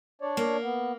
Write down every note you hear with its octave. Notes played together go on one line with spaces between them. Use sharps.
D4 C#5 D5
A#3
B3